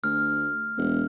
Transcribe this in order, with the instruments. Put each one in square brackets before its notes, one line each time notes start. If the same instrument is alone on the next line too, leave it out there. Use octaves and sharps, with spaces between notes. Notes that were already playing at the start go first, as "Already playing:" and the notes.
[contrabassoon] D2 [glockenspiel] F6
[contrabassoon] E1